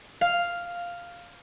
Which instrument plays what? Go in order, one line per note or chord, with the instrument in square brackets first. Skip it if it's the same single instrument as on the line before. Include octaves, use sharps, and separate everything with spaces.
[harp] F5